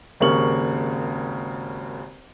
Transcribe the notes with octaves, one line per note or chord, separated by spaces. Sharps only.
G#1 D#2 C#3 A#4 C#6 F#7